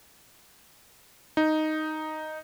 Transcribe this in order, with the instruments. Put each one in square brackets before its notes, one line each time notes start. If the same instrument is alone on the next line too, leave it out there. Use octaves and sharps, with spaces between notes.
[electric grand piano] D#4